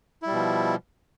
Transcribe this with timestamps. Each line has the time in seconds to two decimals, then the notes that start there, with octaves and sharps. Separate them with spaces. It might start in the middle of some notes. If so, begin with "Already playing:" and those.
0.23 E4
0.27 G3
0.31 B2
0.35 F3